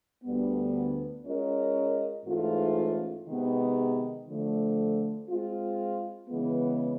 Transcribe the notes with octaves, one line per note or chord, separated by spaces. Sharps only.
D2 D3 G3 B3
G#3 C#4 F4 A#4 D#5
G#2 E3 A3 C#4 F4
C3 D#3 G#3 B3
D3 F3 A3
G#3 C4 F4
C#3 E3 G#3 B3